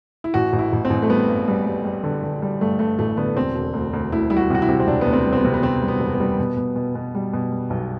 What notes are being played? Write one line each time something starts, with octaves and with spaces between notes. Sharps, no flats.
E4
A1 F#4
A1
E4
A1
C4
A1
A3
G3 B3
G2
G3
G3
G3
D3
D3
G3
G2 A3
G2 A3
A1 A3
D3 B3
E1 C4
E1
D2
D2
D2 E4
G3 E4
F#4
C3 F#4
E4
C3
C4
E1 D4
B3
D2
C4
G3
C4
B3
C3
B3
C3 C4
G3
B3
E1
B3
G3
B2
B2
B2
B2
G3
B2
G3
B1